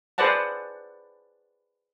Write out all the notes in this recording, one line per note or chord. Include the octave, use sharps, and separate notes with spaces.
G#4 B4 C5 D5 F#5 A5